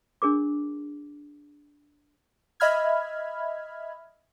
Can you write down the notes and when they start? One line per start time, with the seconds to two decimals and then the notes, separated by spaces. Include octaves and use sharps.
0.22 D4 G#4 A#4 D6
2.60 D#5 E5 B5 F6 G#6